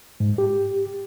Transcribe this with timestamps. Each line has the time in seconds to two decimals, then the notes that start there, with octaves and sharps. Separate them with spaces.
0.20 G#2
0.38 G4